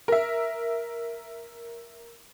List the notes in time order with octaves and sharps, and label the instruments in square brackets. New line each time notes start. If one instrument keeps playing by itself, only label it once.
[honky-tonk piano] A#4 E5